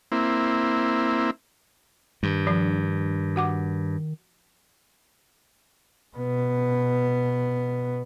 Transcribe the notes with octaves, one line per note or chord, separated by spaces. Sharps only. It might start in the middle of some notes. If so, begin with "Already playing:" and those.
A#3 C4 E4
G2 D#3
F3 D4
F#4 F#5 D6
B2 B3